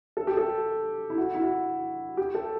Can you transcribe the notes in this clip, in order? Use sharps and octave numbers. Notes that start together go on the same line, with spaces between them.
A4
G4
A4
E4
F#4
E4
F#4
G4
A4